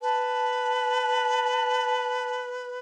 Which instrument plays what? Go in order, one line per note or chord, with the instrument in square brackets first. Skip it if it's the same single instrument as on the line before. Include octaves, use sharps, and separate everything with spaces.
[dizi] B4 [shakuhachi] A5